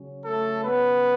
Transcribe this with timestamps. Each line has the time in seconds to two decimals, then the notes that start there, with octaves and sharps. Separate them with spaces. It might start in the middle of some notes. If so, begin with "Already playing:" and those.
Already playing: C#3 F#3 C#4
0.25 A3 A4
0.63 B3 B4